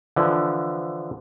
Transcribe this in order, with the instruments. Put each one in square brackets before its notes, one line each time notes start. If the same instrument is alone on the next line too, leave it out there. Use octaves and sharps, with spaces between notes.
[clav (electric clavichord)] D3 E3 F3